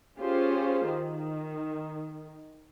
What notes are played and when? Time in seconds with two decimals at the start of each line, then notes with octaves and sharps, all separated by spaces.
0.19 C#4 F4 G4 G#4 C5
0.89 D#3